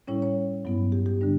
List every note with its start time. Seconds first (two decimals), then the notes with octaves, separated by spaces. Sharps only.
0.07 A2 G3 C#4 E4 C#5
0.22 C#5
0.65 G2 F#3 B3 E4
0.92 G4
1.06 G4
1.21 D3 G3 D4